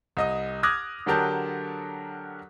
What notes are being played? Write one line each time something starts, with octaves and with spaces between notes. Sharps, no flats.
C2 D#5 D#6
D6 D#6 F6 F#6 G#6 A#6
D3 F#3 G4 A#4 A5 G6